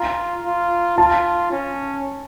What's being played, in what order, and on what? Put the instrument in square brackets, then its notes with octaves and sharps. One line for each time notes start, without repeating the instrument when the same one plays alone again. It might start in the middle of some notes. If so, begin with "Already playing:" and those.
Already playing: [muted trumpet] F4 [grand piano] A#5
[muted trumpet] F4
[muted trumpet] F4 [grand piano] A5
[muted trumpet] C#4